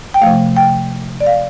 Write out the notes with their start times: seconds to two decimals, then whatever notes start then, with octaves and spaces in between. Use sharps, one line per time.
0.14 G5
0.22 C3 F3 A3 F5
0.57 G5
1.20 D5
1.27 F5